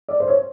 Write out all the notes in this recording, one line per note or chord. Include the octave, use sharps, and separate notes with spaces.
D5
C5
C#5